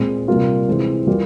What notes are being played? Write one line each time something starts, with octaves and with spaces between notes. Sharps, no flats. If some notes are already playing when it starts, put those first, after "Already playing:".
Already playing: A#2 G#3 C4
C3 G3 A#3 F4
C3 E3 G#3 C4 E4
E3 G3 A#3 F4